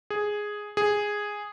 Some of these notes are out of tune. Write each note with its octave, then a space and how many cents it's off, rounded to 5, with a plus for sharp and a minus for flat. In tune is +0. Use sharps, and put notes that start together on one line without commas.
G#4 +0
G#4 -5